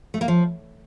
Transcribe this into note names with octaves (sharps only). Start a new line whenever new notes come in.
A3
A#3
F3